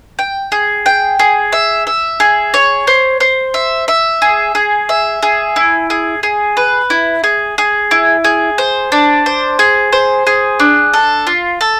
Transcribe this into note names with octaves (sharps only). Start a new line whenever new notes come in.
G5
G#4
G5
G#4
E5
E5
G#4
C#5
C5
C5
E5
E5
G#4
G#4
E5
G#4
E4
G#4
G#4
B4
E4
G#4
G#4
E4
G#4
C5
D4
C5
G#4
C5
G#4
D4
A4
F4
A4